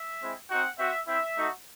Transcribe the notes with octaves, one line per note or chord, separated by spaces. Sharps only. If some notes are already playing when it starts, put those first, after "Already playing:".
Already playing: E5
G#3 C4 E4
C4 D#4 F#4 F#5
C4 F#4 E5
C4 E4 E5
A3 D#4 F#4